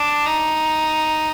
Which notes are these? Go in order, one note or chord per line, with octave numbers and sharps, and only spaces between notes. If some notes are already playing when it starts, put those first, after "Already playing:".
Already playing: D4
D#4